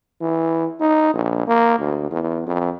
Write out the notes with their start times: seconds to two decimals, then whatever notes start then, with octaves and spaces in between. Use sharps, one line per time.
0.21 E3
0.81 D#4
1.14 A#1
1.48 A#3
1.79 D2
2.11 E2
2.47 F2